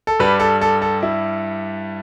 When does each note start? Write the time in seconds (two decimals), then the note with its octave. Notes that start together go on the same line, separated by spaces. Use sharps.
0.07 A4
0.20 G2 G3 B4
0.40 A4
0.61 A4
0.82 A4
1.03 E4